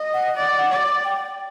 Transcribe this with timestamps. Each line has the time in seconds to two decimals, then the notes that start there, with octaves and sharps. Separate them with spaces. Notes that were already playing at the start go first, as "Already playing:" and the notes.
Already playing: D#5
0.14 F#5
0.36 D5
0.70 D5
1.04 G5